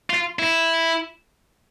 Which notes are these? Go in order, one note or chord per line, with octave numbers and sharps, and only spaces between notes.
F4
E4